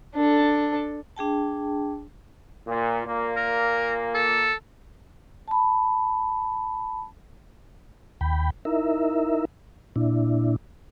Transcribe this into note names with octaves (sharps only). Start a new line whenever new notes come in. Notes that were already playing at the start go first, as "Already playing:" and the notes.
D4 A4
D4 G#4 G5 A5
A#2
A#2 A#3
A#4
A4
A5 B5
D#2 G5 B5
D#4 E4 A#4 E5
A#2 D4 E4